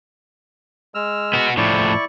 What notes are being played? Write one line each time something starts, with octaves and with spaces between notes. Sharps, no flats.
G#3 E6 F6
B3 F#4
A2 F3 E4 D5 C#6